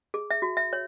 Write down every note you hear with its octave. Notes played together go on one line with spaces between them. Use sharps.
G#4
E5
F#4
E5
C#5